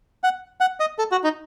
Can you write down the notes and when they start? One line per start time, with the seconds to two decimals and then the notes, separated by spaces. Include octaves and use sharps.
0.24 F#5
0.61 F#5
0.80 D#5
0.99 A4
1.12 F#4
1.24 D#4